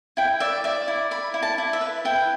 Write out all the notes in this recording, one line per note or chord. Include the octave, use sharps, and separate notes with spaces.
E4 G5
D5 E5
D5 E5
E4
D5 B5
E4
A5
E4
E5
B4
E4 G5